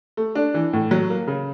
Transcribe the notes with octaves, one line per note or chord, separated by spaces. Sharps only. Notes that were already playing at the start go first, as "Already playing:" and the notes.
A3
D4
E3
A2
F#3
A#3
C#3